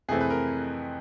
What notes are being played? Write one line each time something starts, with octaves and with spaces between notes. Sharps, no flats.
F2 C3 E3 A3 C4 G#4
B4
A#4